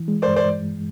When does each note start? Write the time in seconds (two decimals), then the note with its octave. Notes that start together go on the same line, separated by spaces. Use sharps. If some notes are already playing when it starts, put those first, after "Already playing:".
Already playing: E3
0.08 G#3
0.22 C5 D5
0.27 G2
0.36 C5 D5